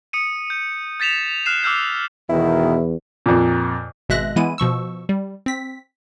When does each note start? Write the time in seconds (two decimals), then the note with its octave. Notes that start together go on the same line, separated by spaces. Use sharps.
0.13 D#6 C#7 D#7
0.50 G6
1.00 G6 A6 B6 E7 F7
1.46 F6 F#6 C7 E7
1.63 D6 E6 F6 G6 C7
2.29 E2 B2 D#3 E4
3.26 F2 A#2
4.09 G#1 B2 G#3 E5 F#6 A#6
4.36 E3 G#3 B3 E4 D#7
4.58 B2 F3 C#6 E6
5.09 G3
5.46 C4 B6